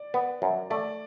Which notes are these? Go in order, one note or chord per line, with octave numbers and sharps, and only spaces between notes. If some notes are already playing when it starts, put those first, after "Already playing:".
Already playing: D5
B3
F#2
A3 D5